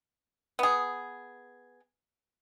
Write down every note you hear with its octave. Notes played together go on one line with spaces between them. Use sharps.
B3 G#4